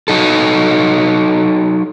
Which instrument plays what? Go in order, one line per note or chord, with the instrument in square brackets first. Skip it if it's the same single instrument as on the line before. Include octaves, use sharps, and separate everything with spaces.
[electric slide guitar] F#3 D#4 A4